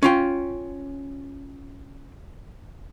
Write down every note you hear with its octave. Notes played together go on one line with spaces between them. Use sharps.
C#4 F4 G5